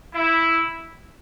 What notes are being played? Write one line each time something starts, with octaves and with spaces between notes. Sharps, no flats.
E4